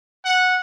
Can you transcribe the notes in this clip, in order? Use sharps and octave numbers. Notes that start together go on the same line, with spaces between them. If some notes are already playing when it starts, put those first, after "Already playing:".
F#5